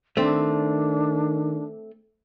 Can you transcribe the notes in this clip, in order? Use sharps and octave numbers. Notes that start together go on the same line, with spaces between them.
D#3 A3 C4 D4